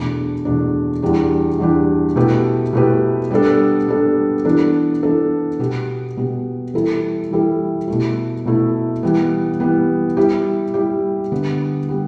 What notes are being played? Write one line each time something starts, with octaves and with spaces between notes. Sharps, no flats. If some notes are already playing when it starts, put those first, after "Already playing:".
Already playing: E2 B2 A3 D4
E2 B2 A3 D4
E2 E3 G3 D4 G4
E2 E3 G3 D4 G4
B2 A3 E4 G4 B4
B2 A3 E4 G4 B4
G3 B3 D4 A4
G3 B3 D4 A4
E3 B3 D4 A4
E3 B3 D4 A4
B2 B3 G4
B2 B3 G4
E3 G3 E4 A4
E3 G3 E4 A4
B2 A3 E4
B2 A3 E4
E3 G3 B3
E3 G3 B3
G3 E4 G4
G3 E4 G4
D3 G3 B3
G3 B3